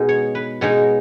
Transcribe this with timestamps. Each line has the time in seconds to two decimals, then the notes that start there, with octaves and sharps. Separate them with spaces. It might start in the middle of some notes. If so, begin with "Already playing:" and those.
Already playing: B2 G#3 D#4
0.09 C#5
0.35 B4
0.61 B2 G#3 D#4 C#5